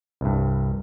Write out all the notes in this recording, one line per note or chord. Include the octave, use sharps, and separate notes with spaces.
C2 G2